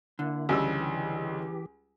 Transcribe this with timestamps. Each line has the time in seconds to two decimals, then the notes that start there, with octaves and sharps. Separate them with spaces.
0.19 D3 A#3 E4
0.49 C#2 E3 G3 G4 E6